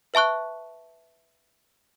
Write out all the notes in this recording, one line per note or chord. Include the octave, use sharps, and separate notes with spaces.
B4 E5 A5 C#6 F#6